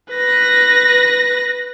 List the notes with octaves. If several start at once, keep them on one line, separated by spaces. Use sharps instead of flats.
B4 A#6